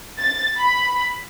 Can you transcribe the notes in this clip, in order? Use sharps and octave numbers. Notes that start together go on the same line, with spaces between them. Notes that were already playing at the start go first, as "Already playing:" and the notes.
A6
B5